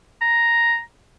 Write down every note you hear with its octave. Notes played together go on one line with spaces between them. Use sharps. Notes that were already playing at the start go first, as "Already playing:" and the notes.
A#5